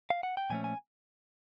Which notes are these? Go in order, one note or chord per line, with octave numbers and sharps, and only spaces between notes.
F5
F#5
G5
A#2 F3 A3 C#4 G#5
G#5